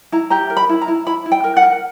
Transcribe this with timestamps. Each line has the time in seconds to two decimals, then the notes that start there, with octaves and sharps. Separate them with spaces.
0.12 E4 A#5
0.30 G4 A#5
0.50 A#4
0.57 B5
0.69 E4
0.82 A#5
0.88 E4
1.06 E4 B5
1.26 E4
1.32 G5
1.44 A#4
1.57 F#5
1.63 A#4